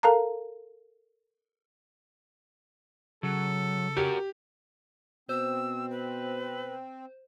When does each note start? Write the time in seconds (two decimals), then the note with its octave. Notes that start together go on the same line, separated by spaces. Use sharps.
0.03 A4 A#4 F5 A5 A#5
3.23 C#3 F#3 A4
3.97 F#4 G4 A#4
5.29 B2 C4 C5 E6
5.91 B4